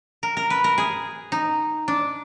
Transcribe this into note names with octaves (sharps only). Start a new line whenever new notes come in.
A#4
A#4
B4
A#4
G#4
D#4
D4